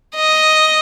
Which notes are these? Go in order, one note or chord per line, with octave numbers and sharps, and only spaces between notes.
D#5